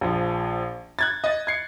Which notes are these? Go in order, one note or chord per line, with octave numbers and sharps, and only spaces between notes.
A#1 F3
F#6 G#6 A6
D#5 A6
G#6 C7 C#7